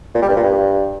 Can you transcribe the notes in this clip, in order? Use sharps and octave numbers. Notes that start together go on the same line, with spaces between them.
A#2
G3
G2
A#2
G2